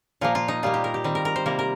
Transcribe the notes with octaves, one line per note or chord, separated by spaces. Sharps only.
A#2 F3 A#3 F4
F4
D#4
A#2 G3 A#3 F4
G4
A#4
G4
D#3 G3 C4
A#4
A#4
C5
C3 G3 A#3 A#4
A#4